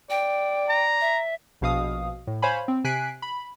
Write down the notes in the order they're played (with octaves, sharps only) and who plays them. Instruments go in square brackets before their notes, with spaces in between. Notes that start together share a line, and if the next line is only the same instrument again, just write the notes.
[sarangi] D5 [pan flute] G5
[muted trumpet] A#5
[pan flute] E5
[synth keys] A#1 B2 F5 D#6
A2
C5 C#5 F5 G#5 B5
C4
C3 G#5 F#6 B6 C7 D7
B5